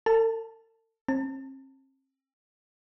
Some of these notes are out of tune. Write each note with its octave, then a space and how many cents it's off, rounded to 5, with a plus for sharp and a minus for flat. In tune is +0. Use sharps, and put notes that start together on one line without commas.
A4 +45 A5 +0
C4 +40 A5 +35